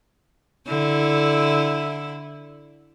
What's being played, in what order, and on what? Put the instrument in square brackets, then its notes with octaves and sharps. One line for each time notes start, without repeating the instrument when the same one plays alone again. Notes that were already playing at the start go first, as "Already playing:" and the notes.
[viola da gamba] D3 E4